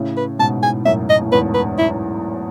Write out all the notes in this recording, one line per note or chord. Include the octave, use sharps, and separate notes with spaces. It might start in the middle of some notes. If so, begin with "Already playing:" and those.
Already playing: A2 C#3
B4
G#2 B2 A5
G#5
F#2 A2 E5
D#5
A2
E2 G#2 B4
B4
E4